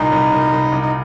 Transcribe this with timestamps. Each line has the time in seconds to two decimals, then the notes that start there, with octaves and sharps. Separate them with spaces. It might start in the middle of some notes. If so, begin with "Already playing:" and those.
Already playing: C2 A#2 D#4
0.12 C2
0.32 C2
0.52 C2
0.72 C2
0.82 D#4